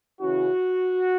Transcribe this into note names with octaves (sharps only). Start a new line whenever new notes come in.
C#3 E3 C#4 E4 F#4